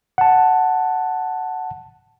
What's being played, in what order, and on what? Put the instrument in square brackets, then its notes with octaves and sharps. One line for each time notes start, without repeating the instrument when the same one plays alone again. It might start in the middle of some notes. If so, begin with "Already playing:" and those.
[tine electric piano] F#5 A5